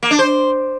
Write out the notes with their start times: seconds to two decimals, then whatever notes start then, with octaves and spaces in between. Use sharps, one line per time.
0.03 A#3
0.11 D4
0.19 C5